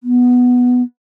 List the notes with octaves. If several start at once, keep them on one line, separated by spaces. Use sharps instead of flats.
B3